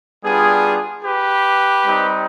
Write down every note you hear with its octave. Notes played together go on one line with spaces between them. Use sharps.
G3 B3 D4 F4 G#4
G4 B4
G3 C4 D#4